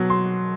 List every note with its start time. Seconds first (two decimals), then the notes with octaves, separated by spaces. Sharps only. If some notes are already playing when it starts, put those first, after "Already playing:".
Already playing: B2 F#3
0.10 C6